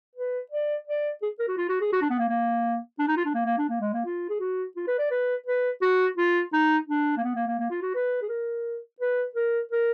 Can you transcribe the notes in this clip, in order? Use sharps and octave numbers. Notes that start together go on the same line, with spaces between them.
B4
D5
D5
G#4
A#4
F#4
F4
F#4
G#4
F#4
D4
B3
A#3
A#3
D4
D#4
F4
D4
A#3
A#3
D4
A#3
G#3
A#3
F4
G#4
F#4
F4
B4
D5
B4
B4
F#4
F4
D#4
D4
A#3
B3
A#3
A#3
A#3
F4
F#4
B4
G#4
A#4
B4
A#4
A#4